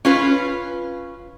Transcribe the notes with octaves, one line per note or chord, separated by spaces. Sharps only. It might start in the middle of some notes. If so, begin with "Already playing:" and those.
C#4 F4 B4